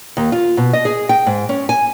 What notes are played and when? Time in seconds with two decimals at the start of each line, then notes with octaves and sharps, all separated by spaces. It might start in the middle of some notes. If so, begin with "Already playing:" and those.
0.17 D#2
0.32 F4
0.57 B2
0.73 D#5
0.85 G#4
1.09 G5
1.26 G#2
1.49 C#4
1.69 G#5